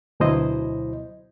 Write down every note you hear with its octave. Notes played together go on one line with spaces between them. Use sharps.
D2 B2 F#3 E4 C5 D#5